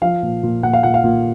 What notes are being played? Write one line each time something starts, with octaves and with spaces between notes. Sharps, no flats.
F3 F5
A#2
A#2
A#2 F#5
F5
A#2 F#5
F5
A#2